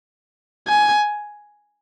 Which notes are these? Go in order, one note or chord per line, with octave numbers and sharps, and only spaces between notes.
G#5